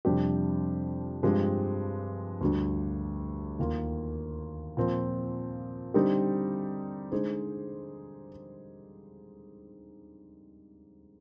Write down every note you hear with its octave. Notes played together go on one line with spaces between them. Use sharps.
F2 C3 G3 D4 G4
G2 F3 G#3 C4 G4
D2 D3 G3
D#2 D#3 A#3 F4
A#2 F3 C4
D3 G3 C4 D#4 G4
D3 G#3 D#4 G#4 C5